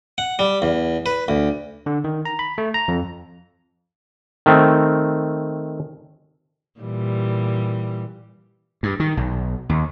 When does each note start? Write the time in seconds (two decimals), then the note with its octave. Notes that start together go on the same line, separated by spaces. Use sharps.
0.18 F#5
0.39 G3
0.62 E2
1.06 B4
1.28 D2
1.86 D3
2.04 D#3
2.25 A#5
2.39 B5
2.58 A3
2.74 A#5
2.88 F2
4.46 D#3 A3 C4
6.81 A#2 E3 G3
8.83 G2
9.00 D#3
9.17 B1
9.69 D#2